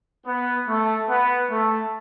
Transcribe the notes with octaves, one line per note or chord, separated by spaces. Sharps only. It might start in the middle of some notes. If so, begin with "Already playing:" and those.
B3
A3
B3
A3